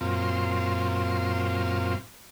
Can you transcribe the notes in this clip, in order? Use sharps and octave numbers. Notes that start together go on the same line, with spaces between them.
F#2 A#2 C4 F4